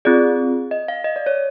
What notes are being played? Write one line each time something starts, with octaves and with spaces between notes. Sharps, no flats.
C4 F4 G#4 D5
D#5
F5
D#5
D5
C#5